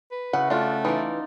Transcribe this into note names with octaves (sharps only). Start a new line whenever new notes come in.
B4
C#3 E4 F#4 F#5
A3 D4 F4
E3 D#4 F4 D5